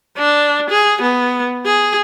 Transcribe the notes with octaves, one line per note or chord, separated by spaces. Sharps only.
D4
G#4
B3
G#4